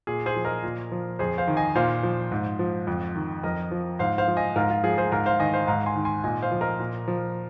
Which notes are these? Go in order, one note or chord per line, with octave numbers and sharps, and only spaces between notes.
A#2 G#4
G#4 C5
F3
A#4 D#5
A#2
F3
F2 G#4 C5
C5 F5
D#3
D#5 G#5
A#2 C5 F5
F3
G#2
F3
F2
D#3
F2 A#4 D#5
F3
G#2 C5 F5
C5 F5
F3
D#5 G#5
G#2 F4 A#4
F4
F3 G#4
G#4 C5
G#2 F4 A#4
C5 F5
D#3 D#5 G#5
C5 F5
G#2 F5 A#5
G#5 C6
D#3
G#5 C6
A#2 D#5 G#5
C5 F5
F3
A#4 D#5
A#2
F3